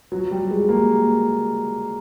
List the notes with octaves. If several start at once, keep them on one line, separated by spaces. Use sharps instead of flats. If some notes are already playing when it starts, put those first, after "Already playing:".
F#3
G3
G#3
A#3